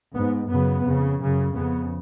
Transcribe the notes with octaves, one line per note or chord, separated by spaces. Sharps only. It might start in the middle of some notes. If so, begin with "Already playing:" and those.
G#2 B3
F#2 C#3 B3
F2 C#3
F#2 C#3
F2 C#3 B3